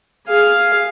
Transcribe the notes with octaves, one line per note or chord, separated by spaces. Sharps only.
G#4 F5